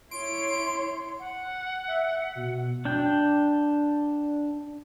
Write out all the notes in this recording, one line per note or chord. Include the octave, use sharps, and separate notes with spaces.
E4 C#5 C6 D7
F#5
E5
B2 F#5
D4 G5